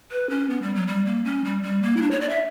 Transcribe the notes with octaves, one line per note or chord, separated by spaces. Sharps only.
B4
C#4
B3
G3
F#3
G3
A#3
C#4
G3
G3
A#3
E4
D4
C#5
D5
E5